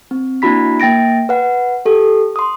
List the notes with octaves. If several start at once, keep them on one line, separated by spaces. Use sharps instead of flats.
C4
A#3 D4 E4 F#4 B5 B6
A#3 G5 A6 A#6 D7
B4 F#5
G4 A4
C6 D#6